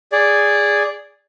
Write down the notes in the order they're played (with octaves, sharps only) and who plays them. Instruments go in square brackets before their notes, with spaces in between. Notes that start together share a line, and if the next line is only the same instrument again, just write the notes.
[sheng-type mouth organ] G#4 D5